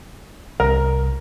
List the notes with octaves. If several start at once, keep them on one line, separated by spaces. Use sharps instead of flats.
C2 A#4